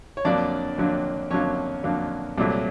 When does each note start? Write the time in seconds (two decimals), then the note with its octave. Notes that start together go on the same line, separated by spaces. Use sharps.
0.17 C#5
0.25 F2 D3 F#3 A#3 D4 D5
0.78 F2 D3 F#3 A#3
1.31 F2 D3 F#3 A#3 C#4 C#5
1.84 F2 D3 F#3 A#3
2.38 C2 A#2 F#3 A3